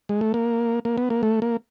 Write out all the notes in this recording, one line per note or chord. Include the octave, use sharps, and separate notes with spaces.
G#3
A3
A#3
A#3
B3
A#3
A3
A#3